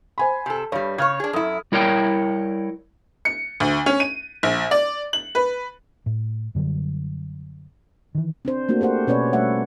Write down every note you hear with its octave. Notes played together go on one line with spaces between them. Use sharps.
C5 G#5 B5
C3 A4
G2 G3 C#5
C#3 C#5 F6 G#6
D4 G#4
F#2 E4 A4 D#6
G3 E4 A#4 C#5 G5
C#7
D2
C#4
D#7
A#1
D5
F#7
B4
A2
F#2 D3 F#3 G3
D#3 E3
C4 D4 C5
A3 A#3 D4 F#4
G4 A4 C5 F#5
B2 C#4 B4 C#5 D5
G3 A3 E5 F#5